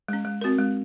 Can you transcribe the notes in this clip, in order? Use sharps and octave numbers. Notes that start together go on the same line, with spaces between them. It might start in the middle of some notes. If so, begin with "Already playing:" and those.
G#3 C#4
G#3
C4 F#4 A#4
G#3